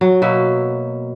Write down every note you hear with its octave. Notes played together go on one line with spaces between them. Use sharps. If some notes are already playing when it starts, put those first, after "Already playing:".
F#3
B2 A#3 E5